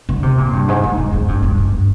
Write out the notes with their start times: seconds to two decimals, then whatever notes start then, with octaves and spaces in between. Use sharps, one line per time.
0.09 D3
0.23 C3
0.38 A#2
0.53 G2
0.68 G#2
0.83 G#2
0.98 G#2
1.13 G#2
1.28 G2
1.43 G2
1.58 G2